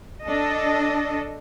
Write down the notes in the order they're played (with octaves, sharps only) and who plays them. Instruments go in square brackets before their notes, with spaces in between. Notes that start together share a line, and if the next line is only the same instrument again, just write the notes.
[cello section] D4 A4 D#5